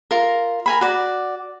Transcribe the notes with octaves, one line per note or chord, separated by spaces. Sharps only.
F4 A#4
A#4 G#5 B5
F#4 D5